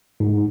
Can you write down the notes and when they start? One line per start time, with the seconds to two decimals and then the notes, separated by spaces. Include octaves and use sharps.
0.20 G#2